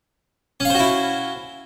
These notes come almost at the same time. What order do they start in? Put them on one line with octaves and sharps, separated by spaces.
C#4 F5 C5 F#4 E4